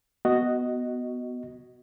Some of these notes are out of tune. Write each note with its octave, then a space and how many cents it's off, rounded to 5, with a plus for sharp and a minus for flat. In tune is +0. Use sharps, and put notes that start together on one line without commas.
B3 +0 F#4 +5 D#5 +0